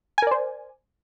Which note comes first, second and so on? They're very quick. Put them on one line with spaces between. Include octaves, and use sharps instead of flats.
G#5 A#4 D5 C5